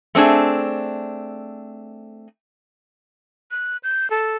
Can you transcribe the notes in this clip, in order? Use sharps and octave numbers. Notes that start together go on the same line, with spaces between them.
A3 C4 D4 G#4
F#6
G6
A4